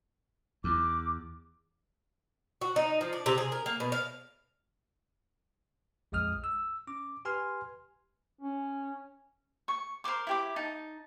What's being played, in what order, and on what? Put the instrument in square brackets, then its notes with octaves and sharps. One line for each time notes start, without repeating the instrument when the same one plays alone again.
[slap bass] E2 [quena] D6
[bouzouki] F#4
D#4
F3
D4
C3
G#4
A#4
A#3
B2
F5
[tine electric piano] A#1 F2 G#3 D#6 F6
E6
C#4 D6
G4 B4 G#5 C6 F6
[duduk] C#4
[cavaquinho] C#6
A#4 C5 C6 D6
E4 G4 D6
D#4 A5